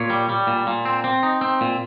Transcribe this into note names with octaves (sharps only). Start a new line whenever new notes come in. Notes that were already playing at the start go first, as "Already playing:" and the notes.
Already playing: A#2 C#5
G3
G3
A#2
A#2
C4
C4
D#4
C4
A#2